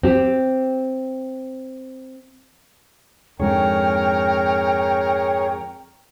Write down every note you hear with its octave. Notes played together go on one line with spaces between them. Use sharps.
C4 G4
F2 G#2 D3 G#4 A#4 C#5 G5